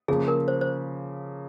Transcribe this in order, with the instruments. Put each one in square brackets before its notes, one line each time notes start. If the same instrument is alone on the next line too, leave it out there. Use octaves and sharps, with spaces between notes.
[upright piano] C#3 F3 A#3 [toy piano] G#4
[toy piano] A#4
C5
C5